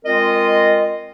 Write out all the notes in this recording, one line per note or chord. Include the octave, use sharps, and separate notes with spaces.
G#3 C4 F4 A#4 D#5